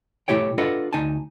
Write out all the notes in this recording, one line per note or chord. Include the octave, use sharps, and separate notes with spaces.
B2 A3 E4 G4 C#5 G5
D4 F4 A4 B4 D#5 F#5
D2 D#4 G#5 A5